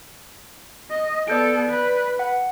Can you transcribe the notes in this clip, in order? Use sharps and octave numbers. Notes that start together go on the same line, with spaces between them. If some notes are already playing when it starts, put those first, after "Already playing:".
D#5
B3 A4 D5 G6 D7
B4
F#5